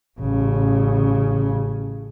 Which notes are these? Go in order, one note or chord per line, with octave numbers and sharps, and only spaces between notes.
A1 C#3